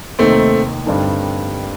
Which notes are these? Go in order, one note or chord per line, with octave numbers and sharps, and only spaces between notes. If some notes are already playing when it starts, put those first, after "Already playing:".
F1 D#2 D#3 A3 A#3 C4 D#4
G2 D3 G3 C4 D#4